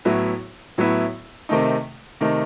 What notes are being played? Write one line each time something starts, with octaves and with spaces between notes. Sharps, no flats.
A2 F#3 B3 E4
A2 F#3 B3 E4
C3 D#3 A3 D#4
C3 D#3 A3 D#4